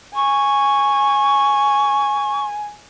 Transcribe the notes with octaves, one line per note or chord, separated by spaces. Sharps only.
G#5 C#6